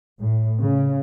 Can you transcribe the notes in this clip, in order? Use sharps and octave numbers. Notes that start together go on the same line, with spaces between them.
A2
C#3